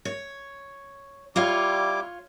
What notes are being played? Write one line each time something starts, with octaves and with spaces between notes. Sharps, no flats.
C#5
G3 E4 F4 C#5 F5 D6